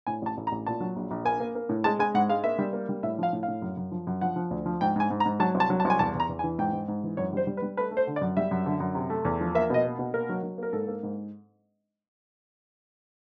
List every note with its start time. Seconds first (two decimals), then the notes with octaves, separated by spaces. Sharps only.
0.07 A2 G#5
0.22 A1 A5
0.37 A1
0.47 A#5
0.52 A1
0.67 A#2 A5
0.80 F#3
0.96 A#1
1.11 A#1
1.25 A#3 G#5
1.40 A#3
1.55 A#3
1.69 A2
1.84 G#3 A5
1.99 G#3 G#5
2.14 G#2 F#5
2.29 G#3 F5
2.44 A#3 E5
2.59 G3
2.73 A#3
2.89 G3
3.03 A2 E5
3.19 F3 F5
3.33 A2
3.43 F5
3.48 A2
3.62 F#2
3.77 F#2
3.92 F3
4.07 F#2
4.21 F3 F#5
4.36 F3
4.51 D2
4.66 F3
4.81 G#2 G5
4.96 G#2 G#5
5.10 G#2
5.20 A#5
5.26 G#2
5.40 F#3 A5
5.55 C2
5.60 A5
5.70 F#3
5.80 A5
5.85 C2 G#5
5.99 E2 A5
6.15 E2 A#5
6.29 E2
6.39 G#5
6.44 E3
6.59 G#2 G5
6.73 G#2
6.88 G#2
7.04 E3
7.17 F#2 C#5
7.33 G3 C5
7.47 G3
7.57 B4
7.62 G3
7.77 A3 B4
7.91 A3
7.97 C5
8.07 D3
8.16 D5
8.21 F#2
8.37 G3 E5
8.51 F#2
8.66 D3
8.80 F#2
8.95 C3
9.10 A3
9.25 E2
9.41 F3
9.55 A#3 E5
9.70 B2 D#5
9.85 A#3
9.99 B2
10.14 A#3 A#4
10.29 F#3
10.43 F#3
10.58 A#3 A#4
10.73 G#2 A4
10.88 A#3
11.03 G#2